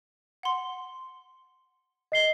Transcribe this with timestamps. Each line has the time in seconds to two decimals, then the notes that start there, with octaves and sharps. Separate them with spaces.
0.43 F#5 C6
2.12 D#5 C7 G7